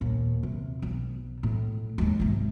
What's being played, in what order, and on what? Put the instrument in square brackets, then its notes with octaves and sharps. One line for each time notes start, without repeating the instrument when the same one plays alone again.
[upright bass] D#2 A#2
C3
B1
A2
D#2 G#3
G#1 C3